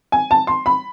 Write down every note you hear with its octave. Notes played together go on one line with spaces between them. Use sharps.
G#5
A5
C6
B5